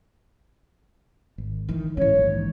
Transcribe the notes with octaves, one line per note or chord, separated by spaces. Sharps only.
G#1
D#3 E3
D1 G#2 D#3 E3 C#4 C#5
A#1 D#2 G#2